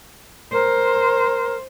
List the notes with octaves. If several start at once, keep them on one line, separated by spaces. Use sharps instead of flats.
A#4 C5